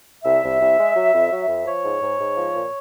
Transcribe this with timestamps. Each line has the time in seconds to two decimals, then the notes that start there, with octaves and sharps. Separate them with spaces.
0.24 C2 E5
0.42 C2
0.60 C2
0.78 G#3
0.95 F#3
1.13 F2
1.31 F#3
1.48 F2
1.66 F3 C#5
1.84 G#2
2.01 G#2
2.19 G#2
2.36 F3
2.54 A#2